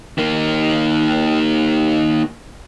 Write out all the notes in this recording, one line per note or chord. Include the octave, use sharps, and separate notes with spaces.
D#3 A#3